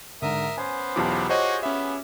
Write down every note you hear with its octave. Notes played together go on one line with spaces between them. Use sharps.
G#2 D3 A#4 E5 D#6
B3 C#4 C5 G#5
B1 E2 F4 G4 A5 D6
F#4 G#4 C5 C#5 D#5
B3 C#4 E5